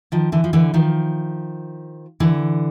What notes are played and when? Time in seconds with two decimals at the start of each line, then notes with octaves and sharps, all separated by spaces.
0.12 D#3 F3
0.32 D3 E3
0.44 F3
0.53 D3 E3
0.74 D#3 F3
2.20 D3 E3